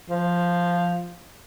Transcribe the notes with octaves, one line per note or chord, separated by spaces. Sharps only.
F3